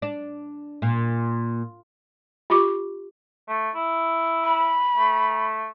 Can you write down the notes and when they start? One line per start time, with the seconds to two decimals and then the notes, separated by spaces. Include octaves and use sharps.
0.02 D4
0.82 A#2
2.50 F4 G4 C#6 D6
3.48 A3
3.75 E4
4.44 B5
4.97 A3